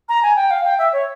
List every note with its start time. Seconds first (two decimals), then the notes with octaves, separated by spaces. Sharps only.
0.09 A#5
0.23 G#5
0.36 G5
0.51 F5
0.65 G5
0.79 E5
0.93 C#5